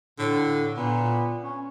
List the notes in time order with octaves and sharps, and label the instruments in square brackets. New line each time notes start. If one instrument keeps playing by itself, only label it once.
[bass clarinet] A2 [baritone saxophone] D3
[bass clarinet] A#2 [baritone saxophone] B3
[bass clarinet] C#4